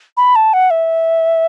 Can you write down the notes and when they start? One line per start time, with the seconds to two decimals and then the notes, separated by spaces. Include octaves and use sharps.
0.17 B5
0.35 A5
0.53 F#5
0.70 E5